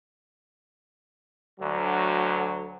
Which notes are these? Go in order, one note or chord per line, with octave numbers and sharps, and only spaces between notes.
D2 F#3